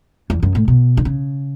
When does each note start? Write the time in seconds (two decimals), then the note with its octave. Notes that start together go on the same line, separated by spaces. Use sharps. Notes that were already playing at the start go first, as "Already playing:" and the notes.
0.30 E2
0.43 F#2
0.55 A2
0.68 B2
0.97 D3
1.05 C#3